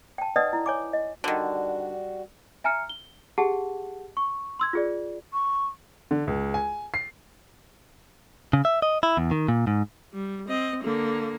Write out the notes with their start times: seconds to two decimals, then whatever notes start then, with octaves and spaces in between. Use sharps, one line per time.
0.18 G5 A5
0.36 D#4 B4 D5 D#5 F#5 D#6
0.53 E4
0.66 C#5 G#5 D6
0.93 D#5
1.24 D3 D#3 G3 F#4
2.64 E5 G#5 A#5 F6 C#7
2.89 G7
3.38 G4 G#4 F#5 A5
4.17 C#6
4.59 C6 E6 G#6
4.73 F4 G#4 D5
5.33 C#6
6.11 D3
6.27 C#2
6.54 G#5
6.94 C7
8.53 C#3
8.65 E5
8.82 D#5
9.03 E4
9.17 E2
9.31 D#3
9.48 A#2
9.67 G#2
10.13 G3
10.48 C4 D#5
10.84 D3 A#3